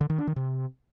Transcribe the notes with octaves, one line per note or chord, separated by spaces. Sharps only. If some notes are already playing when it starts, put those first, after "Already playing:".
D3
D#3
D4
D#3
C3